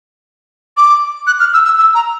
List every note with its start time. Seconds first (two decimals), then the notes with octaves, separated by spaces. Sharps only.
0.77 D6
1.27 F#6
1.40 F6
1.53 E6
1.65 E6
1.78 E6
1.95 A#5